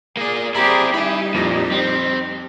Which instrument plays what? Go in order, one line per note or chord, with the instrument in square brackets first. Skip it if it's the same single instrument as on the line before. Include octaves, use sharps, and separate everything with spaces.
[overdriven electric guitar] A#3 D5 [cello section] G#4
[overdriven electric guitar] C4 E4 [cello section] G4 G#4 [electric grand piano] D5 A#5 B5
[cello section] G3 D#4 G4 [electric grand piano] E4 [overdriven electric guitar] G#5 B5
[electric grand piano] F2 A#6 [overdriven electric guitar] A#2
[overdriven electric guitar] C4